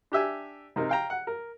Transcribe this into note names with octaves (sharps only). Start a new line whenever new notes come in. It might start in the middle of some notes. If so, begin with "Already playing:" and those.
D4 G4 E5 G#5
C3 D#4 A#4
F5 G5 A#5
F#5
A#4